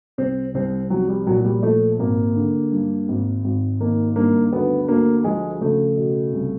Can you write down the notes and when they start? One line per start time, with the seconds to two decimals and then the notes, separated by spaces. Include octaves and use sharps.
0.18 C2 C4
0.54 C2 C4
0.90 F3 F#3
1.09 G3
1.27 A#2 F#3
1.38 F#3
1.45 G3
1.63 F3 A3
1.99 G#1 A#3
2.36 D3
2.72 G2
3.08 G#1
3.44 G#1
3.80 D#3 A#3
4.16 G2 A#3
4.52 D2 B3
4.88 D2 A#3
5.24 F3 G#3
5.61 C#3 A3
5.97 B2
6.33 C2